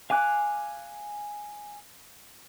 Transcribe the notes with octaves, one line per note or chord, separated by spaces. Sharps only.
F5 G#5 D6 F#6